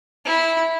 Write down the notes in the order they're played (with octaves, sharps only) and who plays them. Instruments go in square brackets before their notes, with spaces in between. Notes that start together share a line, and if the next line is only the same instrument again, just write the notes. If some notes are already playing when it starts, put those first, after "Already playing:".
[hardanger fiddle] E4